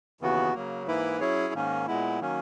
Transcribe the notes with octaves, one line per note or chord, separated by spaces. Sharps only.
D#2 C#3 E3 B3 F#4
C#3 F#3 A#3
G#2 E3 A#3 E4 B4
F#3 C#4 E4 G#4 C#5
G#2 D#3 A#3 C#4
A#2 G#3 B3 E4
D#3 F#3 A#3 C#4